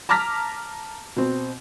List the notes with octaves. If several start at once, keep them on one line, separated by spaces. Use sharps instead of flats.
A5 A#5 D6 F6 A#6 B6
B2 C4